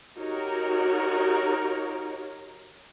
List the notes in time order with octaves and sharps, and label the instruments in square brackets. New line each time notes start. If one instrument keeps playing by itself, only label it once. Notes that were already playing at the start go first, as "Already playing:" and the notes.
[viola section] D#4 F#4 G4 A#4 C#5